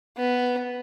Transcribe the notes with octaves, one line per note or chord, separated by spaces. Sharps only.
B3